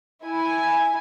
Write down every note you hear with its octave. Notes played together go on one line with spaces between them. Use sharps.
E4 G#5